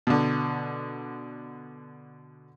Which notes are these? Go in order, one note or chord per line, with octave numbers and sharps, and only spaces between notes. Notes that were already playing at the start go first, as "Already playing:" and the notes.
B2 D3